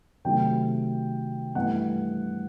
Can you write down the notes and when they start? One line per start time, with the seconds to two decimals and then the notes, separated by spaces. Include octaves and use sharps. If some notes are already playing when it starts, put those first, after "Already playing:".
0.25 C3 D#3 F#3 A3 G5
1.55 G2 E3 A3 F#5